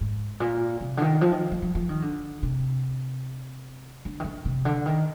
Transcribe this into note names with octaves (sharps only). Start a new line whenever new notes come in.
G#2
A#2
C3
D3
D#3
F3
D#3
F3
F3
F3
D#3
D3
C3
D3
D#3
D3
C3
D3
D#3